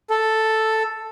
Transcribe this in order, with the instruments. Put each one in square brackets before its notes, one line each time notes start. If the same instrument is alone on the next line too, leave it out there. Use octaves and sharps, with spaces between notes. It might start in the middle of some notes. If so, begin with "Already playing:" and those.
[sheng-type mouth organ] A4